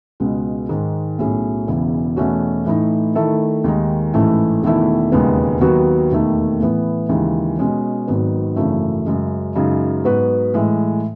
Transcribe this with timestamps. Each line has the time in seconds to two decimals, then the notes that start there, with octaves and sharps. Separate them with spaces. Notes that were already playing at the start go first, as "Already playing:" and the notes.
0.20 C#2 B2 G#3
0.69 G#2 D#3 G#3
1.19 B1 A2 F#3 C#4 G#4
1.68 E1 E2 C#3 E3
2.17 E2 B2 A3 C#4 F#4
2.66 A2 E3 A3 D#4
3.15 D#3 A3 E4 A4
3.64 D#2 D#3 G#3 D#4
4.14 A1 G#2 E3 A3 E4
4.63 E1 E2 D#3 A3 E4
5.12 E1 D#2 C#3 G#3 B3
5.61 D#2 D#3 F#3 B3 F#4
6.11 E1 D#2 D#3 A3
6.60 A2 E3 B3
7.09 D#2 C#3 E3 G#3
7.59 B2 G#3 C#4
8.08 G#1 G#2 D#3 F#3 B3
8.56 G#1 F#2 C#3 E3 A3
9.06 F#2 C#3 G#3
9.55 F#2 C#3 G#3 D#4 G#4
10.04 G#2 F#3 B3 F#4 B4
10.54 A2 E3 G#3